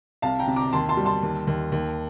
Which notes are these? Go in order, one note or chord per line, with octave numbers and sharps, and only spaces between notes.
C2 F5 A5
G5 A#5
C3
A#5 D6
D#2 A5 C6
A5 C6
G3
A5 C6
D#2
D#2
D#2